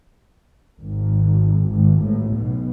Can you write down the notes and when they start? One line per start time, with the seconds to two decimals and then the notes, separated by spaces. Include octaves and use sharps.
0.81 G#1 G#2
1.72 G#1 G#2
2.02 A1 A2
2.33 B1 B2